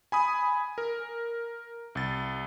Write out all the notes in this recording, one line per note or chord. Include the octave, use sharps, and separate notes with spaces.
G#5 B5 D#6
A#4
C2 A6